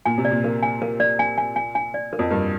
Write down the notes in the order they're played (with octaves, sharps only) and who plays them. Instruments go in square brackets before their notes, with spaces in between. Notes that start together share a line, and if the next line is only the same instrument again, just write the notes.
[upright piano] A#2 [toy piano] G#5
[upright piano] C3
[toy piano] D5
[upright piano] A#2
[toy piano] A#4
G#5
A#4
D5
G#5
G#5
G#5
G#5
D5
A#4
[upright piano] F2
[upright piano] G2 [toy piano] A#4